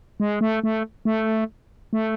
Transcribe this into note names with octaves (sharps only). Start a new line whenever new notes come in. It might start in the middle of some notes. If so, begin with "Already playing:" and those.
G#3
A3
A3
A3
A3